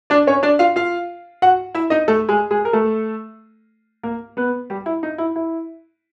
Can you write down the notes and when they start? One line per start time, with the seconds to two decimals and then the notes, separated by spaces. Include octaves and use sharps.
0.10 D4 D5
0.27 C#4 C#5
0.43 D4 D5
0.59 F4 F5
0.76 F4 F5
1.42 F#4 F#5
1.75 E4 E5
1.90 D#4 D#5
2.08 A3 A4
2.29 G#3 G#4
2.51 G#3 G#4
2.65 A#4
2.73 A3 A4
4.03 A#3 A#4
4.37 B3 B4
4.70 G3 G4
4.86 E4
5.03 D#4
5.18 E4
5.36 E4